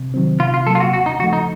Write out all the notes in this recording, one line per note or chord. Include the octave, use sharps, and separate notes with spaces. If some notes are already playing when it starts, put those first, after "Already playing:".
Already playing: C3
D#3 F#3 C4
C3 F4
F4
F#3 A#3 A4
F4
F#4
D#2 F#4
D#4
C#3 F3 A3 F#4
D#4